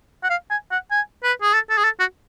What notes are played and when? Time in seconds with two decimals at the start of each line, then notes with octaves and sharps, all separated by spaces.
0.24 F#5
0.30 F5
0.50 G#5
0.71 F#5
0.91 G#5
1.23 B4
1.42 G#4
1.54 A4
1.70 A4
1.78 G#4
1.84 A4
2.00 F#4